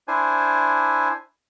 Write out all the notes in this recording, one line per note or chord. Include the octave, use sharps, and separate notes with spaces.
D4 E4 C5 G#5